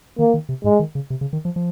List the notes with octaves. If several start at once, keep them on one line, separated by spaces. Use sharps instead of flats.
D#3 A#3
D#3
C3
G#2 G#3
D#3
C#3
C3
C#3
D#3
F3
F3